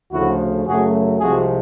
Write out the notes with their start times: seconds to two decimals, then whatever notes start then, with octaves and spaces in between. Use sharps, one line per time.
0.12 D2 C#3 F3 A3 E4 F#4
0.66 F#2 C#3 F#3 A3 F#4 G#4
1.20 C2 C3 F3 G#3 F#4 G#4